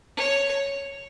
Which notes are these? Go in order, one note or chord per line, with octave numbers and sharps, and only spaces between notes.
C#5